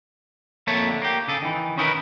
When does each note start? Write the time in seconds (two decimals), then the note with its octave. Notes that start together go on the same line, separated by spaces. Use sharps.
0.67 F2 A#3 A4 C#5 E5 A5
0.89 D3
1.02 A#3 G4
1.28 C#3 G#4 A4
1.42 D#3 E3
1.78 C#4 D#4 E4 F#4 A#4 B4